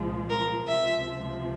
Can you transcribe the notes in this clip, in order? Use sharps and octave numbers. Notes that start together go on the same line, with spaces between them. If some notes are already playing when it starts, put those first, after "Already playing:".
Already playing: C2 A#2 F3 G#3
A#4
C#2 C3 F3 E5